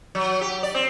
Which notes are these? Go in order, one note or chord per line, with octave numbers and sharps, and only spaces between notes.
F#3
G4
D5
C4